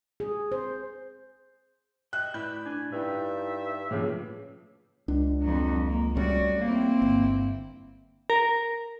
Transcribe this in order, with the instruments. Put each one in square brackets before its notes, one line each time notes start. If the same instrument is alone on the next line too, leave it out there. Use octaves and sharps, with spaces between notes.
[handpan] G#4
C5
[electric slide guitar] D#5 E5 G5 [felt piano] F#6
[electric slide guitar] A2 E4 D5 [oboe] B4 [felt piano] G6
[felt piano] D4 [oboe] G#5
[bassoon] G2 [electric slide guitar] D#4 E4 G5 [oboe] E5
[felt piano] A2 C#3 F3 [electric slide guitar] A#3 G4 G#4
[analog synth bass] C#2 [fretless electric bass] D4
[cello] F2 F#3
A#3
[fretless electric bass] G3 A3 C#4 [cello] F#4 D5
[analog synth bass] A#3 [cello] C4 E4
[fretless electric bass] G1
[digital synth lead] A#4